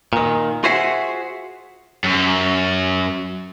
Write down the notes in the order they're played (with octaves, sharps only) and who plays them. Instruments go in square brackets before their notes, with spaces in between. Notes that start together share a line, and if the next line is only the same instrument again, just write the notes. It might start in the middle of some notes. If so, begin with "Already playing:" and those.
[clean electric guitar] A#2 D#3
F4 F#4 G#4 C5 E5 F#5
[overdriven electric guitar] F#2